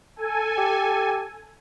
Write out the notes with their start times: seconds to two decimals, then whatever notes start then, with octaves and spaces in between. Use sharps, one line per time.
0.16 A4 G#5
0.58 G4